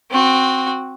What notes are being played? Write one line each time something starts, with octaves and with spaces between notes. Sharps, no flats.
C4 F#4